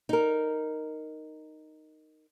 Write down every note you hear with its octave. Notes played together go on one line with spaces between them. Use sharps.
D#4 A#4